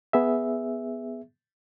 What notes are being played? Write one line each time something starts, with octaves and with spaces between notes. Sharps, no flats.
B3 G#4 E5